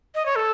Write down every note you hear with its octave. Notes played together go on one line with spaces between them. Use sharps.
D#5
C#5
A4